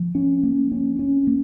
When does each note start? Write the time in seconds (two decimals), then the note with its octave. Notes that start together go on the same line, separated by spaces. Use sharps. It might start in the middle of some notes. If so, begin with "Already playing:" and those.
Already playing: F3
0.15 C#4
0.43 A#3
0.72 C#4
0.99 C#4
1.27 A#3